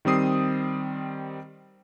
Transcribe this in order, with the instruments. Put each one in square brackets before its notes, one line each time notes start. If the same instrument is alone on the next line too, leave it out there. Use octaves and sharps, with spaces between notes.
[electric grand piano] D#3 G3 C4 D#6 C7